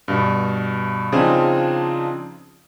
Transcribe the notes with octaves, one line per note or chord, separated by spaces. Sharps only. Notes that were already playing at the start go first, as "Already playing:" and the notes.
G2 B2
C#3 F3 C4 D4 D#4 G#4